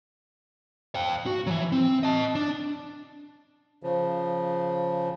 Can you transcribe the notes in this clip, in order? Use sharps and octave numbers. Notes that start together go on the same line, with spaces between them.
F5 G5
F#4
E3 F#3
C4
D#5 A5
D4
C#3 F3